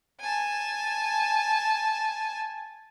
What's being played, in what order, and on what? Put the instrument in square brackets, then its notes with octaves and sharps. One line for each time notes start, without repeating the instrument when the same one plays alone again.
[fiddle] G#5 A5